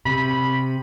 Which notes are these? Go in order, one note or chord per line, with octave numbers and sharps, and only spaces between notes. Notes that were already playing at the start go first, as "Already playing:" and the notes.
C3 B5